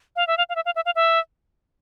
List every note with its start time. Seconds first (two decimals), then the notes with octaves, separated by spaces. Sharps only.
0.16 F5
0.27 E5
0.38 F5
0.49 F5
0.56 E5
0.66 F5
0.76 E5
0.86 F5
0.95 E5